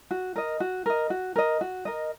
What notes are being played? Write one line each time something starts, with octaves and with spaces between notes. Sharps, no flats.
F#4
A#4 D#5
F#4
A#4 D#5
F#4
A#4 D#5
F#4
A#4 D#5